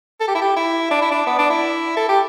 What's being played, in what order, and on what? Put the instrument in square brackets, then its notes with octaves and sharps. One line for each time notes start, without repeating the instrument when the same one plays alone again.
[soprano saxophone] A4
G4
E4
G4
E4
D4
E4
D4
B3
D4
E4
A4
G4